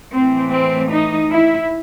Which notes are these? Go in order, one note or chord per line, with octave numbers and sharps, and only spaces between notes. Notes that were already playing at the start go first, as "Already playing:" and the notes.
A2 E3 C4
C4
D#4
E4